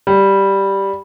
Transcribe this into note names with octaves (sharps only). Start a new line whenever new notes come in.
G3